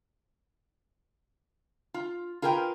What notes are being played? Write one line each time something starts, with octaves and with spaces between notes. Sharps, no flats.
F4
F4 G#4 A#4 B4 G5